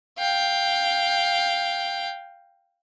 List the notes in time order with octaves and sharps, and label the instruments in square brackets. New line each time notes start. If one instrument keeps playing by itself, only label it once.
[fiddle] F5 G5